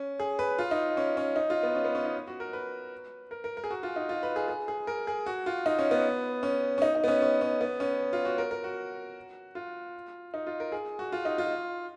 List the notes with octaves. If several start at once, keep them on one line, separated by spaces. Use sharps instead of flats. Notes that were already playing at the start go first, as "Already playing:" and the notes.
Already playing: C#4
G#4
B4
F4
D#4
C#4
C#4
D#4
F4
B3
C#4
B3
C#4
D#4
F#4
A#4
B4
A#4
A#4
A#4
G#4
F#4
F4
D#4
F4
B4
G#4
G#4
G#4
A#4
G#4
F#4
F4
D#4
C#4
B3
C#4
C#4
D#4
D#4
B3
C#4
C#4
C#4
B3
C#4
F4
F#4
A#4
A#4
F#4
F4
D#4
F4
A#4
G#4
F#4
F4
D#4
F4